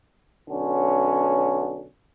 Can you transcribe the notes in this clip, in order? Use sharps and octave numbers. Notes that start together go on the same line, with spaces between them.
B1 D3 C#4